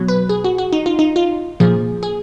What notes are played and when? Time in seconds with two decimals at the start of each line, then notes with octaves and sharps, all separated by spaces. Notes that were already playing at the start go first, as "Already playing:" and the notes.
Already playing: B2 F#3
0.08 B4
0.29 G#4
0.44 F#4
0.58 F#4
0.73 D#4
0.86 F4
0.99 D#4
1.16 F4
1.60 A#2 F3 G#4
2.03 G#4